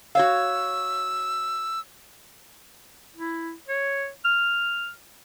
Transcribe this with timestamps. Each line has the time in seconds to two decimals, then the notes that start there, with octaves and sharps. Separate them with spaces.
0.15 F#4 C#5 F5 E6
3.17 E4
3.68 C#5
4.25 F6